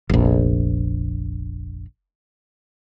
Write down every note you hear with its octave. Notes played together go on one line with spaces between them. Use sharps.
F1 A#1